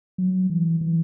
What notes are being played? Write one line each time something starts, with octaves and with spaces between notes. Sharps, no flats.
F#3
E3
E3